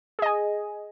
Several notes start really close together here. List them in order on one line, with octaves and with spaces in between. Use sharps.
G#4 D#5 G#5